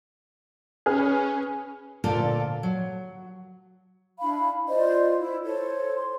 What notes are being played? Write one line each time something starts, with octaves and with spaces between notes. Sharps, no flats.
C#4 G#4 B4 F6
D2 A#2 D3 F4 A4 D5
F#3
D4 E4 F5 B5
F4 C5 D5 D#5
E4
A4 C5 C#5
C6